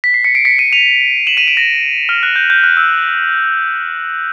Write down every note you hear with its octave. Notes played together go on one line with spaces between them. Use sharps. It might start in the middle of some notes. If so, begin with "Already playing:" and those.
B6
C7
B6 C#7
C7 D7
B6 C#7
C#7 D#7
D#7 F7
E7 F#7
D#7 F7
D7 E7
A#6
F6
F#6
G6
G6
F#6
E6